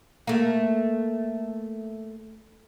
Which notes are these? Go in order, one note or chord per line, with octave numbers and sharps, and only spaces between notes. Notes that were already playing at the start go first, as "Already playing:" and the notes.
A3 A#3